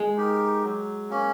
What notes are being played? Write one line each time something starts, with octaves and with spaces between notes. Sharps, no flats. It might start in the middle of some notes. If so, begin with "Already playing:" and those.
Already playing: G#3
D#4 G4 A#4
F#3
A#3 C#4